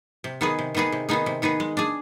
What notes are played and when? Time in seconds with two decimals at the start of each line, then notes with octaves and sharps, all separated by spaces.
0.24 C3
0.41 D#3 B3 D#4 G#4
0.59 C3
0.75 D#3 B3 D#4 G#4
0.92 C3
1.09 D#3 B3 D#4 G#4
1.26 C3
1.42 D#3 B3 D#4 G#4
1.60 G#3
1.77 D4 G#4